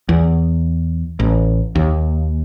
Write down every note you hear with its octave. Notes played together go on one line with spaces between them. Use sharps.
E2
A1
D#2